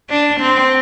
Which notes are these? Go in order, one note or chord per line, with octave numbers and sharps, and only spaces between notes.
D4
C4